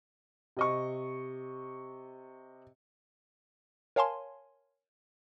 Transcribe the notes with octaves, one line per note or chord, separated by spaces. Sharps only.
C3 D#5 C#6
A#4 C#5 F5 G#5 A5 C6